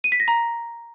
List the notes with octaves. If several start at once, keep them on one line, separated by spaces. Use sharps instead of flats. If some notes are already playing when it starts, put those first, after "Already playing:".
D#7
B6
A#6
A#5